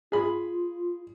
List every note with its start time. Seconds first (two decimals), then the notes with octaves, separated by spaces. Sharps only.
0.12 F4 G#4 B5